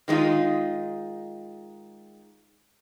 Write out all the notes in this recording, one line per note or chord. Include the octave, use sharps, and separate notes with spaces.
D#3 G#3 B3 D#4 F4